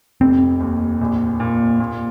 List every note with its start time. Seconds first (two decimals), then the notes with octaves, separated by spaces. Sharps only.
0.21 F1 C4
0.60 D#2
1.01 A#1
1.40 A#2
1.80 A#2